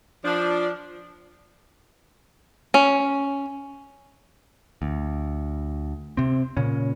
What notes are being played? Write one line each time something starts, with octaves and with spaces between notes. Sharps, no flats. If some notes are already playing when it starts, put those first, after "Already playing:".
F3 D4
C#4
D2
C3 C4
A#2 C#3 C#4